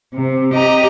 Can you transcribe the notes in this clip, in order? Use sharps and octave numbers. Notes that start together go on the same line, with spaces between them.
C3
G4 D#5 A#5